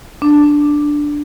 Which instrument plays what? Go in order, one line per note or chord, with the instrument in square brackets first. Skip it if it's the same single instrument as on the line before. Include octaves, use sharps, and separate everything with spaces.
[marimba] D4